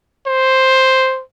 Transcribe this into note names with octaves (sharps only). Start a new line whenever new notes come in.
C5